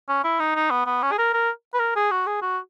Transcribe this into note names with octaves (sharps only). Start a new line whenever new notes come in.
C#4
E4
D#4
D#4
B3
B3
C#4
G#4
A#4
A#4
B4
A#4
G#4
F#4
G#4
F#4